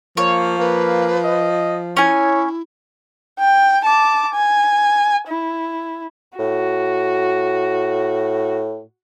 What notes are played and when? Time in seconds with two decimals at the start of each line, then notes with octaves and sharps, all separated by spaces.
0.17 F3 A#3 C#5
0.59 A#3 B4
1.24 D#5
1.97 C#4 E4 C#5 G#5
3.39 G5
3.84 A5 D6
4.35 G#5
5.28 E4
6.39 A2 F#4